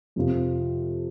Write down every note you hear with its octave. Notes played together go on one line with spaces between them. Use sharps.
F2 C3 F3